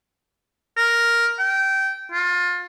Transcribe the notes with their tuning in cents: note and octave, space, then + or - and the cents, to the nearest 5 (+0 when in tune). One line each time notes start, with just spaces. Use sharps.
A#4 +5
G5 -20
F4 +25